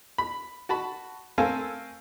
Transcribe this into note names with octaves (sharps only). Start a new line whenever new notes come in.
B5
F#4 A5 B5
A3 C4 A4 A#4 F5 G#5